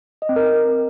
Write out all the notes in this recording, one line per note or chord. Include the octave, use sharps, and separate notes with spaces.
D#5
C4
A#4